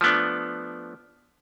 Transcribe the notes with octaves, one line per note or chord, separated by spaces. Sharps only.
F3 A3 B3 D4